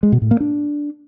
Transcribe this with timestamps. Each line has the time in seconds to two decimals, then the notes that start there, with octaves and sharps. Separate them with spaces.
0.03 G#3
0.12 B2
0.22 A2
0.31 A#3
0.40 D4